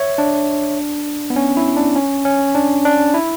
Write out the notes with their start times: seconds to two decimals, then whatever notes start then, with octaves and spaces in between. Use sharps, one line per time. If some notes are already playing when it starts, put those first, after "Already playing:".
Already playing: C#5 E5
0.18 D4
1.30 B3
1.36 C#4
1.57 E4
1.77 D4
1.96 C#4
2.25 C#4
2.55 D4
2.85 D4
3.14 E4